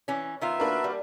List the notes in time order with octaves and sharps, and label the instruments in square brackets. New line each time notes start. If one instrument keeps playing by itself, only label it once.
[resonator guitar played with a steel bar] E3 C#4
[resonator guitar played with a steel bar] D#3 B3 F4 [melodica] E5
[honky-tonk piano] A#3 D4 A#4 [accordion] F#4 B4
[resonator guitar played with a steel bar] G3